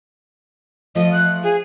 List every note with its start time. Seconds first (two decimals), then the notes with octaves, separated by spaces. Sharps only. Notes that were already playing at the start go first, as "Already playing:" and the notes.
0.95 F3 A3 F4 D#5
1.12 F#6
1.43 G#4